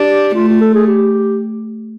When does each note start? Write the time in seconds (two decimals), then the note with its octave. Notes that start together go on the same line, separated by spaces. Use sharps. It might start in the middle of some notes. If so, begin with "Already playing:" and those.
Already playing: D4 G4
0.35 A3 F4
0.48 F4
0.61 A4
0.75 G#4
0.87 G4